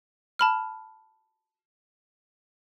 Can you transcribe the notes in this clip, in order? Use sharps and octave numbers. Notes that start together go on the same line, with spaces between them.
A5 B5 F6